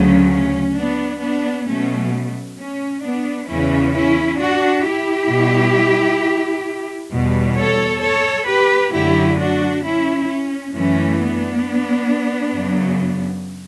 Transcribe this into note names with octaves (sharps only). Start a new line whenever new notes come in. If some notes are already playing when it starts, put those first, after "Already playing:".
Already playing: D2 C#3 F#3 A3 C#4
C#4
B3 D4
B3 D4
B2 F#3 A3 C#4
C#4
B3 D4
E2 C#3 E3 C#4 E4
C#4 E4
D4 F#4
E4 G4
B2 G3
E2 B2 G3
A4 C#5
A4 C#5
G4 B4
F#2 D3 F#3 A3 E4 G4
D4 F#4
C#4 E4
C#4
F#2 E3 A3 C#4
B3 D4
F#2 C#3 F#3